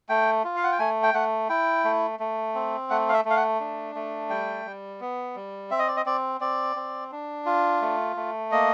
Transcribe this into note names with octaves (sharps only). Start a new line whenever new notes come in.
A3 G5
F4
F5
F#5
G5
A3 G#5
G5
A3 F#5
E4 G5
A3
A3
C4
A3 F#5
F5
E5
A3
F5
F#5
D4
A3
G3 G5
G3
B3
G3
C4 E5
D#5
D5
D#5
C4 D5
C4 D5
C4
D4
F4
A3
A3
A#3 D#5